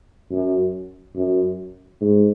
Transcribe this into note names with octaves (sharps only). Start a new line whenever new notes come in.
F#2
F#2
G#2